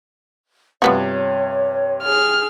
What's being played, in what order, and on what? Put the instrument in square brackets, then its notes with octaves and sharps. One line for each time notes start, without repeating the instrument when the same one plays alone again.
[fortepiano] G2 C3 [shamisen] F3 B3 F#4 [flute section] C#5
[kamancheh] G#4 F6